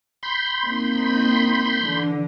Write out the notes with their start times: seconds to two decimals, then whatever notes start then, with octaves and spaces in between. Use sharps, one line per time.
0.23 B5 C6 G6
0.63 A#3 C4 D#4
1.83 D3 E3